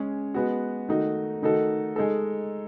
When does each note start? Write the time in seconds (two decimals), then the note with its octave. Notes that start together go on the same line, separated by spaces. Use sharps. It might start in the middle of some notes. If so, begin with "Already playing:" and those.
Already playing: G#3 C#4 G#4
0.34 G#3 B3 F#4
0.89 D#3 A3 D#4 F#4
1.42 D#3 A3 D#4 F#4 A4
1.96 G#3 D#4 A4